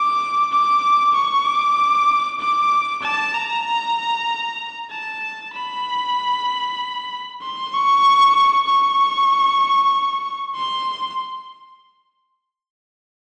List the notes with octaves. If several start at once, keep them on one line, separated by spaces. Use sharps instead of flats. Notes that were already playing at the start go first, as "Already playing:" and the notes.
Already playing: D6
D6
C#6
D6
D6
A5
A#5
A5
B5
C6
C#6
C#6
C6